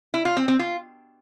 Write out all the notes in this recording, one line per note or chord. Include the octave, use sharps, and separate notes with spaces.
E4
F4
C4
C4
F4